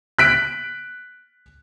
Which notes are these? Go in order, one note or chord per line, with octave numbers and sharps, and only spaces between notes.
F#6 B6 D7